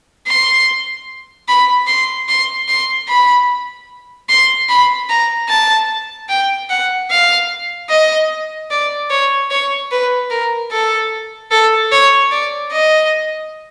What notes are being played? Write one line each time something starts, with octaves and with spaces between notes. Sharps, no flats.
C6
B5
C6
C6
C6
B5
C6
B5
A#5
A5
G5
F#5
F5
D#5
D5
C#5
C#5
B4
A#4
A4
A4
C#5
D5
D#5